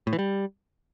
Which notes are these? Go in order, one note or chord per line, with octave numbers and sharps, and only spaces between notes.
A2
E3
G3